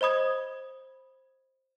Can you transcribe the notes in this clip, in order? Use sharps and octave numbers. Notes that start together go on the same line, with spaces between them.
C5 D#5 B5 D#6 G#6